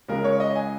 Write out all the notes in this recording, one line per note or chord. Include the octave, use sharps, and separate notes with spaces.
C#2 C#3 G#3 A#4
C#5
D#5
G#5